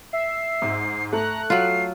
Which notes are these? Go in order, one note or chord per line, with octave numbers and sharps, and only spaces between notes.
E5 C7
G#2
A3 A#5 F#6
F#3 F4 C7